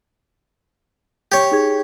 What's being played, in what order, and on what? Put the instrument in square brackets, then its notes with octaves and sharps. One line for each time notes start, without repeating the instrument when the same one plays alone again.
[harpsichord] G4 C#5
[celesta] D#4 G#4 G#6